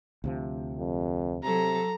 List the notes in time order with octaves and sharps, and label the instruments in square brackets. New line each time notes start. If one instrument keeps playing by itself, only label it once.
[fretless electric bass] D2 C3 F3
[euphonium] F2
[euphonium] C3 [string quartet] F#3 A4 [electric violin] A#5